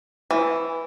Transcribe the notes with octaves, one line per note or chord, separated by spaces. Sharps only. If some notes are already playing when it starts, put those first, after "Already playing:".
E3